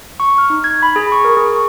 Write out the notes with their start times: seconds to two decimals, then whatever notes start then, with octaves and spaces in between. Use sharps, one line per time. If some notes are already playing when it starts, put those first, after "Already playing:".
0.20 C#6
0.38 F6
0.50 D#4
0.64 G#6
0.82 B5
0.96 G#4
1.12 C#6
1.25 A#4
1.37 G#4
1.52 C#6